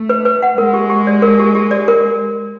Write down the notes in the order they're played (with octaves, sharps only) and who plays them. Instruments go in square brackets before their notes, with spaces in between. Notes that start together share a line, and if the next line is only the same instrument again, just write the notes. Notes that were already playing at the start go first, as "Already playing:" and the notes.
Already playing: [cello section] A3
[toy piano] B4
B4
F#5
[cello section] G#3 [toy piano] A#4
[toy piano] G4
G4
D5
A#4
G4
G4
D5
A#4